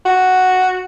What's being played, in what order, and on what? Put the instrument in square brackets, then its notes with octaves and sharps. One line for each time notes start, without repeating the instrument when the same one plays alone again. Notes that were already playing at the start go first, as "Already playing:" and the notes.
[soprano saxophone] F#4